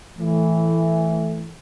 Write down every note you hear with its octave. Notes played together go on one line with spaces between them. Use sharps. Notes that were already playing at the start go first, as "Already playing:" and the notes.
A2 E3